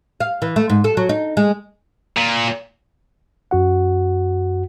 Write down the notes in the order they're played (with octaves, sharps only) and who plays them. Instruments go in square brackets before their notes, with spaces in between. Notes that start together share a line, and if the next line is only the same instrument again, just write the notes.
[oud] F5
E3
A3
G#2
A4
F#3
D#4
G#3
[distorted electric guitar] A#2
[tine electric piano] F#2 F#4 F#5